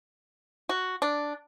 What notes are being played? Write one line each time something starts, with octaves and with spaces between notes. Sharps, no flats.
F#4
D4